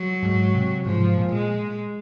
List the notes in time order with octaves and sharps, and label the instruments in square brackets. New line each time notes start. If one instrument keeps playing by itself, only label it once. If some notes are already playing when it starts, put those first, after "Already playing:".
Already playing: [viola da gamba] F#3
[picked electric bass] G#2
C3
[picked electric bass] G#2 [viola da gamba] F3
[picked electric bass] A#2
[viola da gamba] G#3